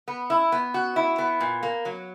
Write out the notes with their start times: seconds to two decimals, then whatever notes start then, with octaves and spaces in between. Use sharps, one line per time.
0.08 B3
0.30 E4
0.52 B3
0.74 F#4
0.96 E4
1.18 B3
1.41 A#2
1.63 A#3
1.85 F#3